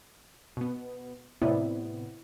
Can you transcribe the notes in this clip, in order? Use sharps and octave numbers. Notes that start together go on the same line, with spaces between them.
B2 B3
A2 C3 B3 E4 D5